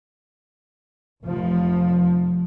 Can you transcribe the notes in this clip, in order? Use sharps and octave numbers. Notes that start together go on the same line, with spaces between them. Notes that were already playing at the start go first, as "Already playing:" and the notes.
F1 F3